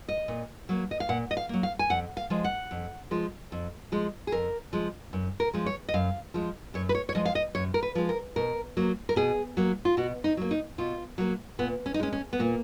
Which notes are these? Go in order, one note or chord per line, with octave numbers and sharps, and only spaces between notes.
D#5
A#2
F#3 A#3
D#5
F5
A#2 F#5
D#5
F5
F#3 A#3
F5
G#5
F2 F#5
F5
F3 G#3
F#5
F2
F3 G#3
F2
F3 G#3
G#4
F2 A#4
F3 G#3
F#2
A#4
F3 G#3
C#5
D#5
F#2 F5
F3 G#3
F#2 C#5
B4
C#5
C#5
F3 G#3 D#5
F5
D#5
F#2 C#5
A#4
B4
F3 G#3
A#4
B2 A#4
F#3 A#3
A#4
B2 G#4
F#3 A#3
F4
B2 F#4
D#4
F#3 A#3
D#4
B2 F4
F#3 A#3
A#2 B3
C#4
D#4
G#3 C#4
C#4
B3
A#2 A#3